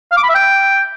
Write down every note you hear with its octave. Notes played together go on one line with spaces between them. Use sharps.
F5
D6
B5
E5
G5